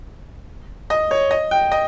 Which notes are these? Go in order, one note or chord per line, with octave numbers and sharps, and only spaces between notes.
D#5
C#5
D#5
G5
D#5